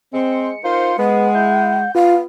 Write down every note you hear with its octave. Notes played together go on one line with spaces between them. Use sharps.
G#3 C4 C#7
D#4 F4 A#4 C5
G#3 B3 F#5
E4 G6
B3 F4 F5